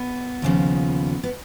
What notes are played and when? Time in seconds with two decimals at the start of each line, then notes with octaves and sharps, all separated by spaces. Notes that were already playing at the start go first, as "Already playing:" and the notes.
Already playing: B3
0.42 D#2 C#3 F3
1.24 B3